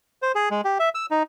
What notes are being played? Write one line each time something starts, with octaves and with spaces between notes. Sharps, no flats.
C5
G#4
G#3
G4
E5
E6
D#4